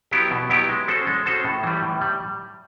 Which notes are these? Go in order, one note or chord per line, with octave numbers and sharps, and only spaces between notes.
F#3 B3 E4 G4
B2
F#3 B3 E4 G4
G#3
C#4 F#4 A4 C5
G#3
C#4 F#4 A4 C5
A2
E3 G3
A2
G3